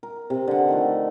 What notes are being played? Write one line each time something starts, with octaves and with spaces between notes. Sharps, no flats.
A#4
C3
D3 F#5
D#3 F3 A3